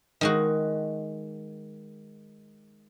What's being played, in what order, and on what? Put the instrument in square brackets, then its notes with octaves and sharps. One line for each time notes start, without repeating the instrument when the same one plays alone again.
[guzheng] D#3 G#3 F#4